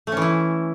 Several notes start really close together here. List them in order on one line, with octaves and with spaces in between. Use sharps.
A3 C#4 E3 E4